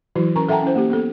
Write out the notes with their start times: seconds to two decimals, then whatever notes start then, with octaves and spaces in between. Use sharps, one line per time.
0.16 E3 F#3 E4 F#4
0.35 C#4 A#4 A#5 C#6
0.48 A4 E5 F#5 G5 A5 A#5
0.62 C#4 E4 C5
0.75 A#3 G4
0.90 B3 A4